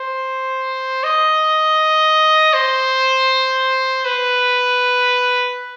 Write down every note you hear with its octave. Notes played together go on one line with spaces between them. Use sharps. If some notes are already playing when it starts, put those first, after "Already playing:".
Already playing: C5
D#5
C5
B4